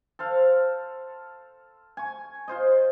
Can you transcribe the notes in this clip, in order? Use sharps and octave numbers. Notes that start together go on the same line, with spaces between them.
A4 C5 F5
G#5 C#6
F4 C5 D#5